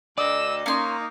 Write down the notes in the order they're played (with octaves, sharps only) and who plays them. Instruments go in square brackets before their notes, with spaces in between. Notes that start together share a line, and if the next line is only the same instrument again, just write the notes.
[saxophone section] D2 D#5 [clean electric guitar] D5 [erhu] E6
[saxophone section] A#3 [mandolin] C#4 C6 [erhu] D#4